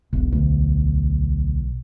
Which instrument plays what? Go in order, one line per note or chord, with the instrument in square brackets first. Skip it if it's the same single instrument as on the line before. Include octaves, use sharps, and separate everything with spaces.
[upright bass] E1 [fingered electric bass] B1
[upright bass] D2 E3